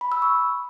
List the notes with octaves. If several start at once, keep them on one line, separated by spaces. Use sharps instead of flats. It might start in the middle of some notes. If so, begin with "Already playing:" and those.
B5
E6
C#6